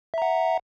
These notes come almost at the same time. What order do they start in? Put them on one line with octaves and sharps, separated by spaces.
E5 A#5 F#5